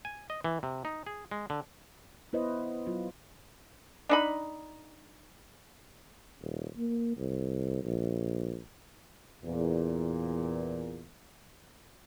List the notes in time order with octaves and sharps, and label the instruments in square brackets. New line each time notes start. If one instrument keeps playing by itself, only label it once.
[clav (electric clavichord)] G#5
D#5
E3
C3
D#4
G#4
G#3
D3
[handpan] B3 E4 B4 C5 D#5
F#3 B3 F4
[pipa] D4 D#4 B5
[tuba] D#1
A#3
C2
A#1
[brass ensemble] E2 A#2